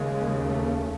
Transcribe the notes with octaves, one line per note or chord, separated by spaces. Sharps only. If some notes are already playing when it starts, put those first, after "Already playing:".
Already playing: D#2 C#3 G#3
A3